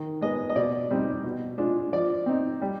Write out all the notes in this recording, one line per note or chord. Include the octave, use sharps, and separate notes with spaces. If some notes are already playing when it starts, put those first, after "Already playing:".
Already playing: D#3
G#3 B3 D#5
D#5
B2 D5
G3 C4 D#4
B2
G#3 D4 F4
F3 D5
C4 D#4
G3